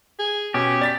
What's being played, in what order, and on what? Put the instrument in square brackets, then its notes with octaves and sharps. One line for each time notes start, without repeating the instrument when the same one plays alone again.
[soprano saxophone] G#4
[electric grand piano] B2 [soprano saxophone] C#4 [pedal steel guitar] G4
[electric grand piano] D5 A6 B6